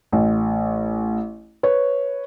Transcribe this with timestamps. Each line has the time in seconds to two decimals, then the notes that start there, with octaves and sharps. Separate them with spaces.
0.12 A1
1.63 B4 C#5